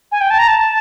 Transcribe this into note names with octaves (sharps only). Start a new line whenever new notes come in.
G#5
G5
A5
A#5
A5